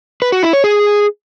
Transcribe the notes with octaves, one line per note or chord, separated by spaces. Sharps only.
B4
F#4
E4
C#5
G#4